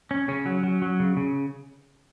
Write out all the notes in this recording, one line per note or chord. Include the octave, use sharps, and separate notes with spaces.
C#4
C#3 C#4
F#3
F#3
F#3
C#3
C#3